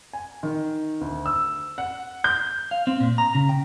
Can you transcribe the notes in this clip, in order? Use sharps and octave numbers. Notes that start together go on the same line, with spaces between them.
G#5
D#3
D2
E6
F#5
G6
F5
C4
A#2
A#5
C#3
G5